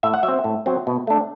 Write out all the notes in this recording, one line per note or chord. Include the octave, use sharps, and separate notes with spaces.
A2 E5
F#5
F#3 E5
C4
A2
F#3 C4
B2
A3 D4